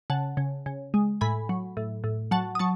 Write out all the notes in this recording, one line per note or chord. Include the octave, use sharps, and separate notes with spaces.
C#3 F#5 A5
C#3
C#3
G#3
A2 G#5 B5
F#3
A2
A2
F#3 F#5 A5
D#6
F#3 A5 C#6